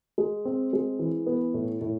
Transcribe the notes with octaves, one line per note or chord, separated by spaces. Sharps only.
G#3
C4
G#3
E3
B3
A2
A2